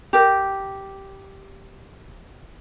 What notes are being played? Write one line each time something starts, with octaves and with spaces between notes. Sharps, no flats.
G4 A#4